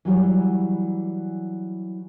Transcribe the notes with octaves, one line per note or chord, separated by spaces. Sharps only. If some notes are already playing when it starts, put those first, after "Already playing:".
E3 F#3 G3